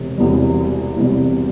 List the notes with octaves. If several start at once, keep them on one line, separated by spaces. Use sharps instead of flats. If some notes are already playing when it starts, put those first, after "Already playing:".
Already playing: E1 C3
E1 E2 C3 G3
E1 E2 C3 G3